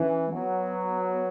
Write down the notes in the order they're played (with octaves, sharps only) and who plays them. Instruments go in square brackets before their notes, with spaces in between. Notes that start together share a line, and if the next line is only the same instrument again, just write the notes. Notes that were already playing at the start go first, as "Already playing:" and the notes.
Already playing: [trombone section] E3 [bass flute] C#4
[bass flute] G#3
[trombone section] F#3 [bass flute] B3